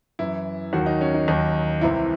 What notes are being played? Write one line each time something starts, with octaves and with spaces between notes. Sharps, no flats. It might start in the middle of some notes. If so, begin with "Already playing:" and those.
F#2 E3 E4
D#2 D#3 F#3 F#4
D#4
C#4
D#4
D#2 D#3 F#3 D#4
C2 C3 E3 E4